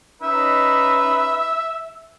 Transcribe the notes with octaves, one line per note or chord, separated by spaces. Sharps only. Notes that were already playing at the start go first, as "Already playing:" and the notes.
C#4 D#4 B4 E5